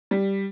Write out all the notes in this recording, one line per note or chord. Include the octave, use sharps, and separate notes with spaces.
G3